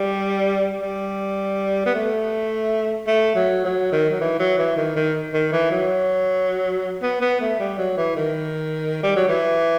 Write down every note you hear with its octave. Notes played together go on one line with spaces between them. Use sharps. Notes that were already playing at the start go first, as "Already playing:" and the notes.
Already playing: G3
G3
B3
A3
A3
F#3
F#3
D#3
F#3
E3
F#3
E3
D#3
D#3
D#3
E3
F#3
B3
B3
A3
G3
F#3
E3
D#3
G3
F#3
E3